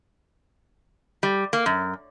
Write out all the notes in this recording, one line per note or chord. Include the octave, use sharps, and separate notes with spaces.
G3
A#3
F#2